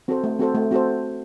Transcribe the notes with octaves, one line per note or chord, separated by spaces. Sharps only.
C4 F#4 A4 C5
A3
C4 F#4 A4 C5
A3
C4 F#4 A4 C5